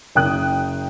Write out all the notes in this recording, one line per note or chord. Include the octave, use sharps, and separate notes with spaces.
F#1 G5 D#6 F#6